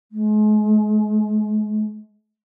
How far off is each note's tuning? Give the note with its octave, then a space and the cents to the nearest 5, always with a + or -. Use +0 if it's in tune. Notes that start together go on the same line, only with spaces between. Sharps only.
G#3 +35